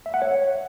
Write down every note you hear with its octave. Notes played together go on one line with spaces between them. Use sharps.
E5
F#5
C#5